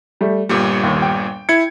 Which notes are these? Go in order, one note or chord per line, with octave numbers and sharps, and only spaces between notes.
G3 A3
G1 A#2 G3 C#7
D#2
G5
E4 G#6 C#7